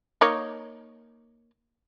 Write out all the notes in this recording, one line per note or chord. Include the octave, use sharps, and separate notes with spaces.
A#3 D#4 C#5